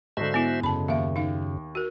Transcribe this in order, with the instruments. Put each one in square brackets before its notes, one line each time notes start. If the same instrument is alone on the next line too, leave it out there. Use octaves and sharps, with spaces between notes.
[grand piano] G#2 D3 [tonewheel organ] F#4 C5 E5
[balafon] B3 E4
[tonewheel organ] F#2 C#3 [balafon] A5 B5
[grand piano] D#2 [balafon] E5 F5
[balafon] D#4 F5
F#4 A#4